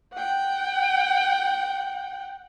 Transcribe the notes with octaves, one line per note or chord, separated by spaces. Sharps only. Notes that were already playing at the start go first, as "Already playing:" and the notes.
F#5 G5